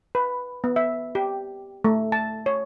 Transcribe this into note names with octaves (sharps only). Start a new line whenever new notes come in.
B4
B3
E5
G4
A3
A5
C#5